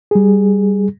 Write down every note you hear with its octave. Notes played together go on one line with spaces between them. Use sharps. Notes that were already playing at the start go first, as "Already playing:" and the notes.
G3 G#4